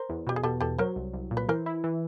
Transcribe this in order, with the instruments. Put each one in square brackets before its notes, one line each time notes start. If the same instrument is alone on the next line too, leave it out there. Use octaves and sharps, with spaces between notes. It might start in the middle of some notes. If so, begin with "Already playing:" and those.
Already playing: [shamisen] A#4 C5
[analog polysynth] E2
[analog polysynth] B2 [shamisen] G4
[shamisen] G#4
[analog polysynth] B2 [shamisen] G4 A4
[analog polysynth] E2 [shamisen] G4 A4
[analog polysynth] F#3 [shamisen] A#4 C5
[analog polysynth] C2
C2
A#2
[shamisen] B4
[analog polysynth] E3 [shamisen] A#4 C5
[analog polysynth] E4
E3